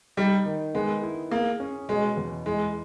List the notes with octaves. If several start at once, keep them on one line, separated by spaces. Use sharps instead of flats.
G3 D#4
D#3
G#3 B3
E4
A#3 G#4
C#4
B2 G#3
E2
G#3 E4